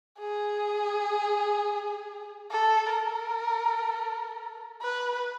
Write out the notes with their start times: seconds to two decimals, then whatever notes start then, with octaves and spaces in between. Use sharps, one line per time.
0.19 G#4
2.51 A4
2.89 A#4
4.82 B4